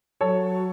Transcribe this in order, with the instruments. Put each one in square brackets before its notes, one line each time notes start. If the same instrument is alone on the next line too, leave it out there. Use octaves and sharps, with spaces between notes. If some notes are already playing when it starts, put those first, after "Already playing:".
[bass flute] F#3 [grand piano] A4 C#5